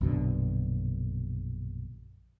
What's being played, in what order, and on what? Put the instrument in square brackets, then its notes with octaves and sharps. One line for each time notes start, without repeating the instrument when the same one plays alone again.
[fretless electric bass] A#1 F#2 B2 D3